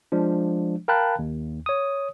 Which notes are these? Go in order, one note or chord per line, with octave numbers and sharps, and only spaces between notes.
F3 G#3 D4
A#4 F5 G5 A5 B5 F#6
D#2
C#5 D#6